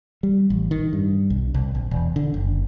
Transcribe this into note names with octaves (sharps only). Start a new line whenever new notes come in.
G3
A1
D#3
G2
B1
C2
A#1
E1
D3
F#1